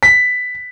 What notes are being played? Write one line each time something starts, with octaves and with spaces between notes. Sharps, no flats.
B6